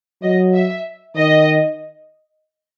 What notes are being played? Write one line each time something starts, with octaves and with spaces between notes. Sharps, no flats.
F#3 D#5
E5
D#3 D#5